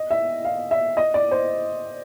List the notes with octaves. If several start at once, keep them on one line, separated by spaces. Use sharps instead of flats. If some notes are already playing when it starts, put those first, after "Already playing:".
Already playing: D#5
E5
F5
E5
D#5
D5
C5